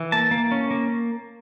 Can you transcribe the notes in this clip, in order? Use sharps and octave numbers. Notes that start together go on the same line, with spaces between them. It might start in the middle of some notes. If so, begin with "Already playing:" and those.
Already playing: E3
A#3 A5
A#3
C#4
A#3